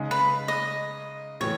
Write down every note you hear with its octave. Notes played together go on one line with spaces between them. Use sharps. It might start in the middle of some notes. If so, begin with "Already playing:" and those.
Already playing: C#3 G#3 D#4
B4
D#5
A2 E3 C#5